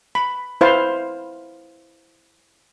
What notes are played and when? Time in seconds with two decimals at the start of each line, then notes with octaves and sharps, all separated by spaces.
0.15 B5
0.61 E4 B4 C5 F5